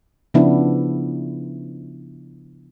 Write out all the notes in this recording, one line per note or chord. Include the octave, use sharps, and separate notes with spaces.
C#3 F3 B3 D4 E4